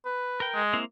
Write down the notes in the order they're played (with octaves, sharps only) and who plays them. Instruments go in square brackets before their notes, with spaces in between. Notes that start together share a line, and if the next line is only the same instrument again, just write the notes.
[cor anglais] B4
[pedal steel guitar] A#4 G5
[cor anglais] G#3
[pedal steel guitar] A#3 C4 E4